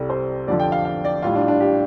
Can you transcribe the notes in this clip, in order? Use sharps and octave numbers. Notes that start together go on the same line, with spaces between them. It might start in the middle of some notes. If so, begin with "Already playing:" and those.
Already playing: C2 C3 G3 A4
C5
F2 D3 F3 D5
G5
F5
F5
D5
A1 A2 G3 F4
D4
D4
G4